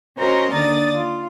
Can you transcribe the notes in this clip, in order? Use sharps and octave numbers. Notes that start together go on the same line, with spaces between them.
C#4 F#4 A#4 C5 D#5 A#5
D#2 D3 D5 D#6 A6
F4